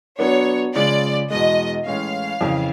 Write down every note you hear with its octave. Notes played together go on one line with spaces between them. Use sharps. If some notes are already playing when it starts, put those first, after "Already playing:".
F#3 B3 D4 C#5
C#3 F3 G#3 D5
E2 B2 G#3 D#5
A2 E3 G#3 C#4 F5
F2 C#3 E3